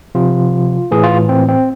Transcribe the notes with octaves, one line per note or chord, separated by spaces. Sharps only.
C3 F3 F4
A2 E3 G#4
F4
C4
C4